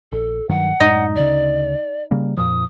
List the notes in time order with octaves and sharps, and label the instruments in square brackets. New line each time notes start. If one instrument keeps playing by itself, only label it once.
[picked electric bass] A#1 [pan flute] A4
[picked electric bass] G2 D#3 F#3 [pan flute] F#5
[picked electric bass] F#2 A2 G#3 [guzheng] D#4 D#5
[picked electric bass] D2 C#3 [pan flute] D5
[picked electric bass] C#3 G3 A#3
[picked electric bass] F2 A#2 F3 [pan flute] D#6